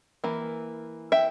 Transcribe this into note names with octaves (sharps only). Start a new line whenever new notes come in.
E3 A#3
E5 G5